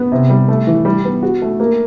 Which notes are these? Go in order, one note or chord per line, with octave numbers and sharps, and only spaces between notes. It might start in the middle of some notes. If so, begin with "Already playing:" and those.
Already playing: B3
C3
G3
A3
E3
G3
B3
F#4
A3
A#3